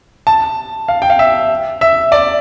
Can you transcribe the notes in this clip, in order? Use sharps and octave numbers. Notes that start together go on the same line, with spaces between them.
A5
F5
G5
F5
E5
E5
D5